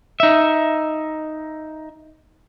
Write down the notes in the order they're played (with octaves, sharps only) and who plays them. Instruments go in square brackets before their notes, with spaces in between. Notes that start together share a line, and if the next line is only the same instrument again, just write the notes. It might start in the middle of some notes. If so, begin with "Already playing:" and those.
[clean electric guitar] D#4 E5